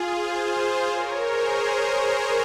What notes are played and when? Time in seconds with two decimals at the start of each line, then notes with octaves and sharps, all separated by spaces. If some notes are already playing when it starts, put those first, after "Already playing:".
Already playing: F4 G#4
0.17 G#4 C5
0.89 A#4 C#5
1.24 G#4 C5